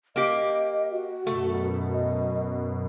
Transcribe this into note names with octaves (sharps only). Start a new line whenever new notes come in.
A#3 G4 D#5
F#4
F#2 B2 A3
D#5